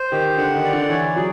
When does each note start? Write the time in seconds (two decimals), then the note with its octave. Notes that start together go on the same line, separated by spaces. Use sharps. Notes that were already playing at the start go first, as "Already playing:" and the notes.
Already playing: C5
0.12 D#3 G4
0.38 D3 F#5
0.55 D#3
0.64 D5
0.73 D3
0.89 E3 C#5
1.16 F#3 G#4